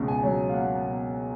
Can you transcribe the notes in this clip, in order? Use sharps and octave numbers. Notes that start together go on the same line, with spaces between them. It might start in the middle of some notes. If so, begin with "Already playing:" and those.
Already playing: C#2 B2
G#5
F#3
F5
A#3 F#5
B2